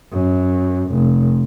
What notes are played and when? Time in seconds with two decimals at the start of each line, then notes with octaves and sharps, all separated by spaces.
0.12 F#2
0.92 F1